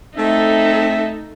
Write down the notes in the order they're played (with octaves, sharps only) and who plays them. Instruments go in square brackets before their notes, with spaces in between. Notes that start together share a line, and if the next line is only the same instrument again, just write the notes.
[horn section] A3 C4 E5 [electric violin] D#4 A4